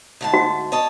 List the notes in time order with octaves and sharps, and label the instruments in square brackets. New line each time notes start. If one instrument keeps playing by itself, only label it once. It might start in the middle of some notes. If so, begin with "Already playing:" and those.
[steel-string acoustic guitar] D2 G#2 A5
[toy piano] F#4
[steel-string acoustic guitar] C#5 D#5 A5